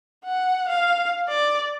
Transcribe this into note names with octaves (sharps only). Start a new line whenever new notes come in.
F#5
F5
D5